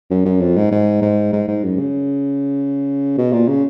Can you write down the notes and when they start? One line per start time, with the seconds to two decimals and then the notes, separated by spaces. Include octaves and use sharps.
0.10 F#2
0.25 F#2
0.40 F2
0.56 G#2
0.71 G#2
1.02 G#2
1.33 G#2
1.48 G#2
1.63 F#2
1.79 C#3
3.18 B2
3.33 A#2
3.48 C#3